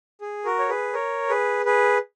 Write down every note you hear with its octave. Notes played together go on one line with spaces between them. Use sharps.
G#4
F#4 A#4
C#5
G#4 B4
A#4 C#5
G#4 B4
G#4 B4